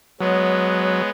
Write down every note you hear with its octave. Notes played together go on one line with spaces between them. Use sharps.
F#3 G#3 B3 C#5